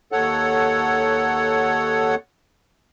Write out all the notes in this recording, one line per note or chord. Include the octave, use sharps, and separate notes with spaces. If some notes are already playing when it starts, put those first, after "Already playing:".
D#2 A4 C#5 F#5